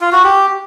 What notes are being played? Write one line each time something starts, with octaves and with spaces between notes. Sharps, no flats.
F4
F#4
G4